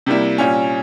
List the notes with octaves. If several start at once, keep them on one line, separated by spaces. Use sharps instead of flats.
C3 G3 A#3 E4
A#2 G3 C#4